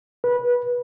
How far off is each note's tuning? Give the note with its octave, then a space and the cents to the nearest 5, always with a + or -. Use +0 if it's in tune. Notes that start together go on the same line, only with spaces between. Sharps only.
B4 -20